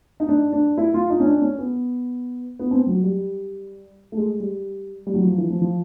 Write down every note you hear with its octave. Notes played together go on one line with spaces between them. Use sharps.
D#4
D4
D4
E4
F4
D#4
C#4
D4
C#4
B3
B3
C4
F#3
G3
A3
G#3
G3
G3
F#3
F3
E3
F3
F3